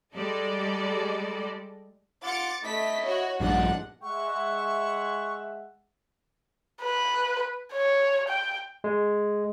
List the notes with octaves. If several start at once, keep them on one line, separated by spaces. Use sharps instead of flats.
G3 G#3 A4 D5 D#5
F4 F#5 D6 A6 C#7
A3 E4 D#5 B6
F#4 C#5
A#1 G2 F3 D4 D#4 F#5
G#3 E5 F#5 C#6
B4
C#5
G5
G#3